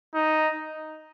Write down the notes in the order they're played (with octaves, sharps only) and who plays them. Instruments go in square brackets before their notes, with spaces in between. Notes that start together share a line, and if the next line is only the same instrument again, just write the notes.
[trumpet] D#4